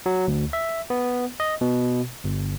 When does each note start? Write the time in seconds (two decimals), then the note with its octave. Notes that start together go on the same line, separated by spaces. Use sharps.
0.06 F#3
0.28 D2
0.53 E5
0.90 B3
1.40 D#5
1.61 B2
2.24 G1